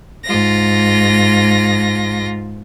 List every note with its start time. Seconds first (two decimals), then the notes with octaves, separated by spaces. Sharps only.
0.25 G#2 F4 A#6